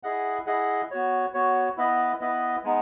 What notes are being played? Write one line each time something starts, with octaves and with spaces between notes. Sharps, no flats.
E4 G#4 D#5 F#5
E4 G#4 D#5 F#5
B3 F#4 C#5
B3 F#4 C#5
B3 E4 B4 D#5
B3 E4 B4 D#5
G#3 B3 D#4